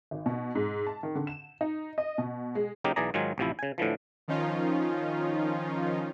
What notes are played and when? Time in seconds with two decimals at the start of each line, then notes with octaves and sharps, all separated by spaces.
0.11 G#1
0.26 B2
0.55 G#2
0.87 A5
1.03 D#3
1.15 D3
1.27 E7
1.61 D#4
1.98 D#5
2.18 B2
2.55 G#3
2.84 C#3 F#3 A#3 D#4 G4 A#4
2.96 B1 E3 G#4 D5 A#5
3.14 G#2 D#3 F#3 F4 G#5
3.38 A1 C3 F3 E4
3.59 C#3 G#5
3.78 A2 D3 E3 F3
4.28 D#3 F3 C#4 D#4 F4